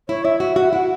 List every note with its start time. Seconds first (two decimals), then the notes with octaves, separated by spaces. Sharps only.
0.09 E4 C#5
0.25 E4 E5
0.40 F#4 E5
0.56 F#4 F#5
0.73 E4 F#5